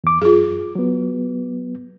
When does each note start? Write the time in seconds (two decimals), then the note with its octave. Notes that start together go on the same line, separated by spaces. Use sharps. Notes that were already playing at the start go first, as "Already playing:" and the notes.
0.04 E2 D6
0.22 F#2 F4 G#4
0.75 F#3 B3